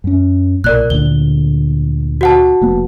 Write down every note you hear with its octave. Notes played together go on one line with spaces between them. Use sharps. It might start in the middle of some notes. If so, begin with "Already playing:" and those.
F#2 C#4
B1 A#2 A#4 D5 F#6
D2 A#2 D3 G7
F#4 F#5 A5
F1 A#3 B3